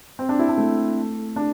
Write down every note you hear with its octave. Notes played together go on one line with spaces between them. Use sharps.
C4
D4
E4
D4
A3
D4